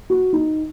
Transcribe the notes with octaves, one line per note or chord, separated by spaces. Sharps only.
F#4
D#4